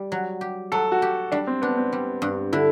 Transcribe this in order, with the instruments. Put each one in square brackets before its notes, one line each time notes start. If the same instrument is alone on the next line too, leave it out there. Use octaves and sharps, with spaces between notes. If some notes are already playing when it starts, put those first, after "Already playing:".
Already playing: [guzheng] G3
F#3
G4
[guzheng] F#3 [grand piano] A4
[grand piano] F#4
[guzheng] G4
[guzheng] G3 [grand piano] D4
[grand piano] C4
[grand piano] B3 [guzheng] D4
[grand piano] C4
[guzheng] G3
G2
[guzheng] D3 [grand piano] E4